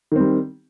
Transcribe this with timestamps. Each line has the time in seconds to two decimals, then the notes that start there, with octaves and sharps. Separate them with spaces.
0.12 D#3
0.16 C4
0.20 G3